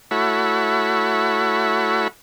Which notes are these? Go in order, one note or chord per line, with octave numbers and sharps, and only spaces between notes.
A3 E4 F#4 C#5 B5